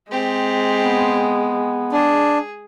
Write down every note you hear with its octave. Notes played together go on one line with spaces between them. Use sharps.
G#3 C4 G4
B3
D4 G#4